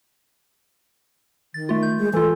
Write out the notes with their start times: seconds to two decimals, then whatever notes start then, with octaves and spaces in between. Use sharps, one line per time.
1.54 D#3 A6
1.69 A3 F4
1.83 G6
1.98 G#3
2.13 E3 F4 A4